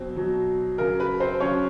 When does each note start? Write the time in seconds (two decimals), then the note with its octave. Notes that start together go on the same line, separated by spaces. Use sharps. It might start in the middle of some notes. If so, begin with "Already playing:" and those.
Already playing: B2 F#3 C4
0.16 B2 F#3
0.78 C#3 F#3 A#4
1.00 B4
1.20 C4 C5
1.40 C#3 F#3 C#4 C#5